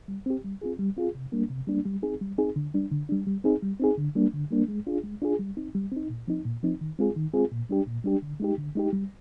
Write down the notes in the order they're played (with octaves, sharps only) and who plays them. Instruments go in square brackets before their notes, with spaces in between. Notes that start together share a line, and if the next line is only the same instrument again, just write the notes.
[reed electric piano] G3
C4 G4
G3
C4 F4 G#4
G3
C4 F4 G#4
C3
G3 A#3 D4
C3
G3 A#3 D4
G3
C4 D#4 G#4
G3
C4 D#4 G#4
D3
G3 D4
D3
G3 D4
G3
C4 D#4 G#4
G3
C4 D#4 G#4
D3
G3 A#3 D4
D3
G3 A#3 D4
G#3
D4 F4 G#4
G#3
D4 F4 G#4
G3
C4 D#4
G3
C4 D#4
A#2
F3 C4 D#4
A#2
F3 C4 D#4
D#3
G#3 C4 F4 G#4
D#3
G#3 C4 F4 G#4
A#2
G3 D4 G4
A#2
G3 D4 G4
D3
G#3 D#4 G4
D3
G#3 D#4 G4
G3